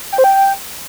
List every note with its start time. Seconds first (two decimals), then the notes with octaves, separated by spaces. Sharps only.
0.12 G5
0.18 C5
0.24 G5